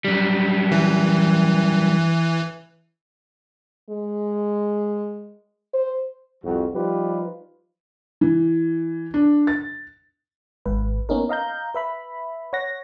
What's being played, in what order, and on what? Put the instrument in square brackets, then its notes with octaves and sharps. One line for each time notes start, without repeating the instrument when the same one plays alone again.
[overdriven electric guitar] F#2 G3
[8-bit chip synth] E3
[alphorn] G#3
C5
[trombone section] C2 F2 F3 F#4
F3 G3 D#4 F4 G4 B4
[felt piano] E3
D4
A6
[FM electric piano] G#1 G#2 B4
A#3 B3 C#4 D#4 A#4
D#5 F5 A#5 G6
B4 E5 B5
C#5 F#5 A#6